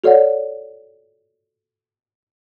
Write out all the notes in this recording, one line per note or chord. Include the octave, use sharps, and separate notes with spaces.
F#4 A4 C#5 D5 F#5